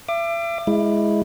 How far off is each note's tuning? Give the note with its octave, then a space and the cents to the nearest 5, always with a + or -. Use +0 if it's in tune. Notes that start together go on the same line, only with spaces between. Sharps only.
E5 +40 D6 +25
G#3 +0 E4 +0